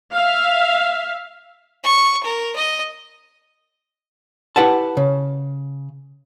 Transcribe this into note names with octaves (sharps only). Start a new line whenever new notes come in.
E5 F5
C#6
A#4
D#5
E4 G4 B4 F#5 A5
C#3